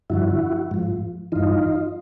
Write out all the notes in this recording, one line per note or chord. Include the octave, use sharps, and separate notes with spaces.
G2 D3 F3 E4 F#4
G#2 F3
G2 E3 D#4 F4